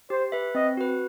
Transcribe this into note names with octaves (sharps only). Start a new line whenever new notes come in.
G4 C5
B4 E5
C4 D#5
F#4 B4